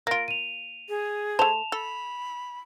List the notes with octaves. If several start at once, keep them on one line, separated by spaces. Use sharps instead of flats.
A#3 F4 A#6 D7
D#7 F7
G#4
A3 C5 A5 E7 F7
A4 B5